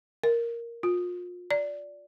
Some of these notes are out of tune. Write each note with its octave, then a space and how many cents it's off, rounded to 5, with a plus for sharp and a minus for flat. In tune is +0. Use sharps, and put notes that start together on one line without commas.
A#4 +0
F4 +35
D5 -10